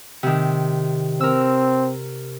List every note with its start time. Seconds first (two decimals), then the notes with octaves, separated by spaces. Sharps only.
0.23 C3 D#3
1.20 C4 A#4 E6